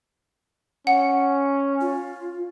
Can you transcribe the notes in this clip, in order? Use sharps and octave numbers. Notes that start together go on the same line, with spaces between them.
C#4 F#5
F4